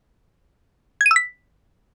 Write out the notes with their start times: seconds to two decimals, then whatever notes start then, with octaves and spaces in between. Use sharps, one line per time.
1.01 G#6
1.06 D#7
1.11 E6
1.16 B6